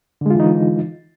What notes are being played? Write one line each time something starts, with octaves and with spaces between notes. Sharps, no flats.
D3 E3 G#3 D#4 F4